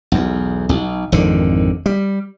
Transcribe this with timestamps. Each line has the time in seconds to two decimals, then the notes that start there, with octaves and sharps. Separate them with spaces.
0.12 B1 E2
0.69 B1
1.12 G#1 F2 D3 D#3
1.86 G3